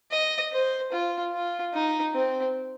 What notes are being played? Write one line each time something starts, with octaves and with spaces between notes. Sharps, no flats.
D#5
C5
F4
F4
D#4
C4